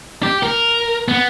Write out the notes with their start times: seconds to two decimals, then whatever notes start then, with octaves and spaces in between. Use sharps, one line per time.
0.23 G4
0.43 A#4
1.08 B3